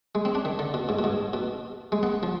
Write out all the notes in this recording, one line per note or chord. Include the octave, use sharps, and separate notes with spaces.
G#3
C4
D4
D#3
D3
B2
G#2
B2
G#2
B2
G#3
B3
F3